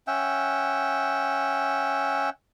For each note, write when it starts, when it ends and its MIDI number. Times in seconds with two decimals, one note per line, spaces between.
0.07 2.30 61
0.07 2.30 76
0.07 2.30 78
0.07 2.30 79